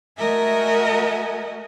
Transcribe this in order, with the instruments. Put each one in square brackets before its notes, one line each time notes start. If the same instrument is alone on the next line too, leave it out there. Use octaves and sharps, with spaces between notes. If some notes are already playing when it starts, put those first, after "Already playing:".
[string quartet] A3 F#4 A#4 D#5 E5 G#5